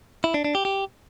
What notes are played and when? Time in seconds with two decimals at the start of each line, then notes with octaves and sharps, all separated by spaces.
0.24 E4
0.34 D4
0.44 D4
0.55 G4
0.65 G4